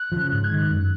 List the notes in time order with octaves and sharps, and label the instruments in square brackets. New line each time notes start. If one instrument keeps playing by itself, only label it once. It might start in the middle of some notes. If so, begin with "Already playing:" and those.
Already playing: [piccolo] F#6
[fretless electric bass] C#3 F3
[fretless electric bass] G#2 [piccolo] F#6
[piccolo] G#6
[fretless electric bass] D#3 G#3
[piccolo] F#6
[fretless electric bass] F#2